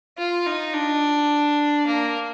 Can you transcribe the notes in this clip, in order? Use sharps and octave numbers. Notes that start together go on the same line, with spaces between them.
F4
D#4
D4
A#3